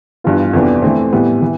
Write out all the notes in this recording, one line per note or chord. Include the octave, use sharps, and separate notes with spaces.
G2 E3 B3 F4
F2 C3 E3 B3 D4
E3 A3 C4
A2 E3 G3 B3
E3